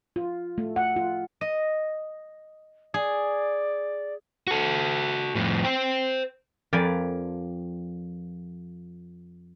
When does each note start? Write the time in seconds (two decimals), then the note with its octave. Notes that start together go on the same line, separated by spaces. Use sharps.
0.16 F4
0.58 A3
0.76 F#5
0.96 F4
1.41 D#5
2.94 G#4 D5
4.47 F#4 A4
5.35 F2 A2
5.65 C5 G5
6.73 F2 F3 A#4 D5 G#5 B5